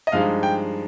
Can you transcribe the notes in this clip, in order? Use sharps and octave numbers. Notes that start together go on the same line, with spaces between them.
D#5
G2 F3 G#3 D#4 F5
G5